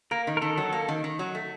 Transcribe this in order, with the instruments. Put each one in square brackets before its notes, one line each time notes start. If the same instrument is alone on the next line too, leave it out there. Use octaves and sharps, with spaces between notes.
[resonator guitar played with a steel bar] A#3 [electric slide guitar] A#4
[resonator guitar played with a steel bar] D#3
[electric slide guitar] A#4
[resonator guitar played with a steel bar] D#3 [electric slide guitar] A4
[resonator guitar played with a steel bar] F#3
A#3
D#3
D#3
F#3
A3